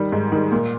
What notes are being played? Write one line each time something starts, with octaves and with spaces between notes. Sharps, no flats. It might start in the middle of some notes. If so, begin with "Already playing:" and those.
Already playing: D#3 G3
G#2
D#3 G3
A#2